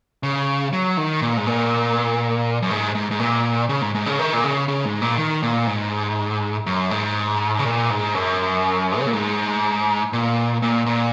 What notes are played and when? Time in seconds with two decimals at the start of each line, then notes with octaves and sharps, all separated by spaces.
0.23 C#3
0.73 F#3
0.97 D#3
1.22 A#2
1.37 G#2
1.47 A#2
2.62 F#2
2.71 G#2
2.95 G#2
3.11 G#2
3.20 A#2
3.69 C#3
3.82 G#2
3.95 G#2
4.06 C#3
4.19 D#3
4.33 A#2
4.44 C#3
4.68 C#3
4.85 G#2
5.02 A#2
5.18 D#3
5.43 A#2
5.67 G#2
6.66 F#2
6.91 G#2
7.59 C#3
7.65 A#2
7.90 G#2
8.15 F#2
9.00 C#3
9.07 A#2
9.14 G#2
10.13 A#2
10.62 A#2
10.86 A#2